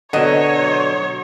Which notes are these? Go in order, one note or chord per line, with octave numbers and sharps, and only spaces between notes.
B2 D3 F#3 C#5 D#5